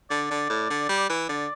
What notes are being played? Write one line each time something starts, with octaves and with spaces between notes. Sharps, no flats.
D3 D5
D3
A2
D3
G3
E3
D3 D5